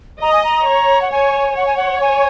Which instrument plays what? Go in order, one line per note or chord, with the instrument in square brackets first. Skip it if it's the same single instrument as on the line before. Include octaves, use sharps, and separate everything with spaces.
[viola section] D#5 [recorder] A#5
[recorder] G#5
A#5
[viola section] C#5
[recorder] F#5
[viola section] C#5 [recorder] G#5
[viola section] C#5 [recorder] F#5
[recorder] G#5
F#5
G#5